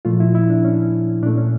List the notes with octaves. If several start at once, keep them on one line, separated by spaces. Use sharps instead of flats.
A#2 F3 A3 F4
E4
E4
D4
C#4
A#2 A3 D4
C#4